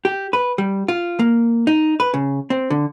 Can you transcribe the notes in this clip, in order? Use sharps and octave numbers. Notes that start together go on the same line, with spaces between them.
G4
B4
G3
F4
A#3
D#4
B4
C#3
C4
D3